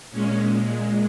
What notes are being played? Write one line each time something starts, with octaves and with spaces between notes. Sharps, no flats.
A#2 G#3 C#4